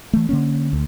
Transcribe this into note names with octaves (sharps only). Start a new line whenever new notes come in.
E3 A3
D3 A#3 C#4
D2